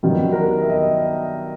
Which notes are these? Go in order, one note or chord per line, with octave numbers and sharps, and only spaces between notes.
G2 D#3 F#3 B3
A#4
E5
D#5